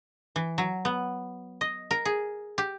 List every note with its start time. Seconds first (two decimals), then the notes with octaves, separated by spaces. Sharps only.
0.36 E3
0.58 F#3
0.85 B3
1.61 D#5
1.91 A#4
2.05 G#4
2.58 G4